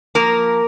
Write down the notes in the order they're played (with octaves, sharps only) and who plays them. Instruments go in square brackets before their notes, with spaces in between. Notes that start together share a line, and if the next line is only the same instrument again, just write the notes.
[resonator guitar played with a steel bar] F3 A#3 A#4